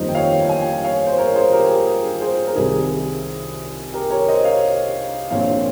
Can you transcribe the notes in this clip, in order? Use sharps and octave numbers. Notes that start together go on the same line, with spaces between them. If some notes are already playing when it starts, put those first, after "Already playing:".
Already playing: G1 F2 D#3 G3 A#3 C5 D#5
G5
C#5 F5
G5
F5 G#5
C#5 F5
C5
A#4 C#5
G#4 C5
G4 A#4
G#4
G#4
G#4 C5
A#4
C2 C3 D#3 G#4
G4 A#4
A#4 C#5
C5 D#5
C#5 F5
A#1 A#2 F3 C4 C#5 F5